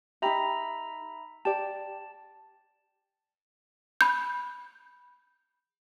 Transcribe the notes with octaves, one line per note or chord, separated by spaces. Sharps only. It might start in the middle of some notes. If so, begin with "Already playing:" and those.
D#4 G4 E5 A#5 B5
G4 D5 A5
B5 G6